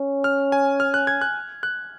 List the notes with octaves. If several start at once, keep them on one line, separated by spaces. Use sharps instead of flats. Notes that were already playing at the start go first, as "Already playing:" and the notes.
Already playing: C#4
F6
G#5
F6
F#6
G#6
F#6
F#6